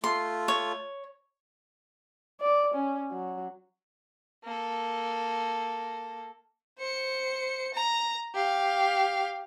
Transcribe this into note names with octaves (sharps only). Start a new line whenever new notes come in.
A3 F4 C6
C#5
D5
C#4
F#3
A#3 A4
C5 C#7
A#5
G4 F5